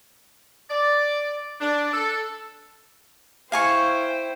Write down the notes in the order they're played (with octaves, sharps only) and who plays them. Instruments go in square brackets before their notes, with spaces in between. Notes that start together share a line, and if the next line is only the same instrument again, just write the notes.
[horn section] D5
D4
A4
[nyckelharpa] E4 C5 [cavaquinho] F5 G#5 C#6 [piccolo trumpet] G5